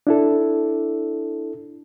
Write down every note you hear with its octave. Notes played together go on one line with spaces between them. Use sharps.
D4 E4 A4